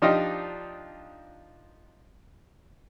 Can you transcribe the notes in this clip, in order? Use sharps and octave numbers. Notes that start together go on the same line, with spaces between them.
F3 D4 D#4 F4 G4 D#5